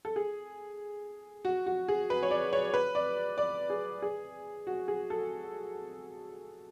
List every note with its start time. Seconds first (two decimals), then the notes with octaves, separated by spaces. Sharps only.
0.05 A4
0.16 G#4
1.45 F#4
1.66 F#4
1.88 G#4
2.10 B4
2.23 C#5
2.31 D5
2.53 C#5
2.74 B4
2.95 D5
3.38 D5
3.70 G#4
4.02 G#4
4.67 F#4
4.88 G#4
5.10 A4